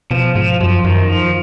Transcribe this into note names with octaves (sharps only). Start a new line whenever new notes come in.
B2 F3
G#2 F3
F#2 F3
F#2 D#3
F3